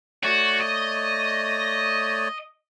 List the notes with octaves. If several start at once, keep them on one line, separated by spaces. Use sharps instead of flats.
A3 F#4 C#5 D5
D#5